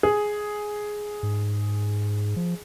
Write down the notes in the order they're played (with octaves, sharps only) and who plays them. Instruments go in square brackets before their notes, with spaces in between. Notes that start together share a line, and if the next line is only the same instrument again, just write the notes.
[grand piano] G#4
[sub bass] G#2
F3